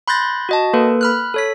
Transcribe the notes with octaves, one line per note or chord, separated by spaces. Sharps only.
B5 C6 F#6 G6 A6 A#6
F#4 D#5 A5
A#3 A4 B4
B5 F6 F#6
A4 C#5 B6